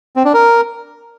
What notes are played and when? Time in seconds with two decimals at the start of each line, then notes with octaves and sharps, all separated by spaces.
0.16 C4
0.25 D4
0.34 A#4